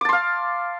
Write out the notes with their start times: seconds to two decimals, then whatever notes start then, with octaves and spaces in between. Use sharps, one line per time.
0.01 D6
0.05 A5
0.09 C6
0.13 F5